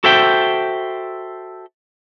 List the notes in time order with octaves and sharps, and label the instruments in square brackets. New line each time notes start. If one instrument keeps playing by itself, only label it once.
[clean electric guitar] F#4 A4 C5 E5 G5